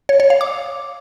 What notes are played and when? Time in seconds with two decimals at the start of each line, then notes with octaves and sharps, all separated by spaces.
0.09 C#5
0.20 C#5
0.30 F5
0.41 D6